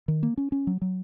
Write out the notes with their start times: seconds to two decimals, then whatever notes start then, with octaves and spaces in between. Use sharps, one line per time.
0.08 D#3
0.23 A#3
0.38 C#4
0.52 C#4
0.67 F#3
0.82 F#3